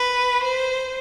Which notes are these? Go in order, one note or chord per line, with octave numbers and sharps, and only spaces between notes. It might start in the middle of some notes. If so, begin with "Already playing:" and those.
Already playing: B4
C5